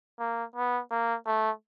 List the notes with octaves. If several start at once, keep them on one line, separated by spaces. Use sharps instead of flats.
A#3
B3
A#3
A3